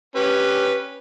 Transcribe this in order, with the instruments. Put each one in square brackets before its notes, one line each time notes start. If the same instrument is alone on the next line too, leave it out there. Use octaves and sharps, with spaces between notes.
[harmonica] C#4 G4 B4